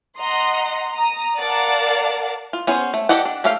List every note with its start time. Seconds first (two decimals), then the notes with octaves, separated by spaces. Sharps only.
0.19 D#5 F#5 A#5 C6
0.93 A#5 D#6
1.38 A#4 D5 F5 F#5 A5
2.53 F4
2.67 B3 C#4 G#4 C5
2.94 A3
3.09 G4 A4 D5 D#5 F#5
3.25 D4
3.44 A3 G4 A4 D5 F5